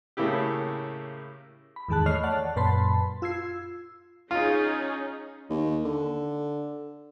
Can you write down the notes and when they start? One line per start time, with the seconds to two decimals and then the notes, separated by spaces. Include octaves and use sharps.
0.17 A2 C#3 A#3 E4 G4
1.76 B5
1.88 E2 G#2 D#3 G#4 A5 F#6
2.06 A3 C#5 D#5 B5 F6 C7
2.23 C#5 D5 F#5 A5 F#6
2.56 F#2 A#2 B4 A5 B5 C6
3.22 F4 E6 G#6 C7
4.31 C#4 D#4 F4 G#4
5.50 D#2
5.85 D3